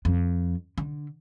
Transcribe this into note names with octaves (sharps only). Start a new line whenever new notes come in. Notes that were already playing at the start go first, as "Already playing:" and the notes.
F2
D3